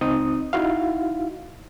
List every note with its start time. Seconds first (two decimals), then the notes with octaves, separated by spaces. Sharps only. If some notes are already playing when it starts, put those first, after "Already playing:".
0.01 C#2 C4 D#4 D#6
0.53 D#4 E4 F#4 F5